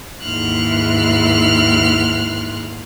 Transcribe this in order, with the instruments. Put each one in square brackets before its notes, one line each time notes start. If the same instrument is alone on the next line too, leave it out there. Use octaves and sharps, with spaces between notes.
[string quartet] D#2 G#2 E3 C6 F6 F#6